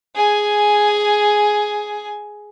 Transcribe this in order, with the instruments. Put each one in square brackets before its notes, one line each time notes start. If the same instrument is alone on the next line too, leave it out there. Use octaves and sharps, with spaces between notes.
[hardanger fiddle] G#4 G#5